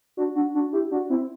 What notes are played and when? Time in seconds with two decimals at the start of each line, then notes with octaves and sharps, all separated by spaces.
0.17 D4 F#4
0.35 D4 F#4
0.54 D4 F#4
0.73 E4 G4
0.91 D4 F#4
1.09 C4 E4